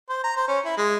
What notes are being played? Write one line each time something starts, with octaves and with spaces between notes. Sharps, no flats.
C5
A#5
C5
C#4
E4
G#3